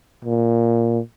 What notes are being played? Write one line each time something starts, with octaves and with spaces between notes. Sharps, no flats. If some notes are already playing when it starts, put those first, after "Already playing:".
A#2